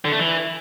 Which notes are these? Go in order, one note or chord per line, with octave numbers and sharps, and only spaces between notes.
D3
A3
E3